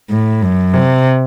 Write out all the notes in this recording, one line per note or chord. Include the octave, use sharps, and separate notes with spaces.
A2
F#2
C3